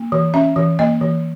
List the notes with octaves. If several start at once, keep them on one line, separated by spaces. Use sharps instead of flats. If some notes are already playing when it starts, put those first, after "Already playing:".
Already playing: A#3
E3
C#4 E5
E3
A#3 D#5
E3